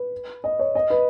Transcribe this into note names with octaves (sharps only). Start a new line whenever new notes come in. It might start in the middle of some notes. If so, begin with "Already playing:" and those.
Already playing: B4
D#5
C#5
D#5
B4